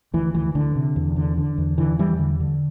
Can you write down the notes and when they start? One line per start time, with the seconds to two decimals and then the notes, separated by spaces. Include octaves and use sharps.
0.14 D2 E3
0.34 D2 E3
0.55 D2 D3
0.76 C3
0.96 E2
1.16 D3
1.38 D3
1.58 E2
1.78 D3 E3
1.99 E2 E3 G3
2.19 D3
2.40 D3